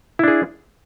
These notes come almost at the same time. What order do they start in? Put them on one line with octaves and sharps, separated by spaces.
E4 D4 G#4